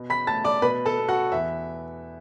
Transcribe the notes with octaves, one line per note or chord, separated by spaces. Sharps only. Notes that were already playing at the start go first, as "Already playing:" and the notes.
Already playing: B2
B5 B6
A3 A5 A6
D5 D6
B2 B4 B5
A4 A5
B3
F#4 F#5
E2 E5